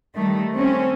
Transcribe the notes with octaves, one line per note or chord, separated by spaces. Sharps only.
D#3 G3 A3
C4 C#4